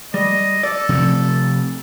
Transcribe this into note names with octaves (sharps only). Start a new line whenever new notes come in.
G3 D#5
A4 D5
C3 F3 A3